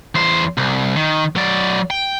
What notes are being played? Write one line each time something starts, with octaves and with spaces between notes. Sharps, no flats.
E2 C5
C2
D#3
F#3 D5
G5